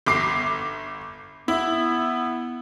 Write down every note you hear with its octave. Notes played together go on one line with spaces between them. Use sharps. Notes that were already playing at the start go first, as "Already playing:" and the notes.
G1 D6 C7
B3 E4